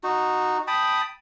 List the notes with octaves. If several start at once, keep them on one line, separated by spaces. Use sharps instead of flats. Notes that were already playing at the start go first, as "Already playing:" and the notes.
D#4 F#4
G5 A5 B5 D#6